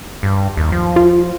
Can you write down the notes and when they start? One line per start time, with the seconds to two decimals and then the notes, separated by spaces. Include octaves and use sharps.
0.23 G2
0.57 D#2
0.72 F3
0.96 F4